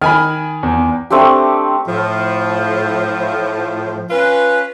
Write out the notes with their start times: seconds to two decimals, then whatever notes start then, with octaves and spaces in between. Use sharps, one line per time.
0.02 D#3 G#5 B5 F6
0.63 E2
1.10 A3 C4 D4 G4
1.87 A2 F3
4.10 C#4 F4 B4